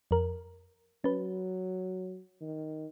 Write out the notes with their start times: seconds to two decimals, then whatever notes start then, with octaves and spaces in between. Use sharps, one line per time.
0.11 F2 A#4
1.04 F#3 C#4 B4
2.41 D#3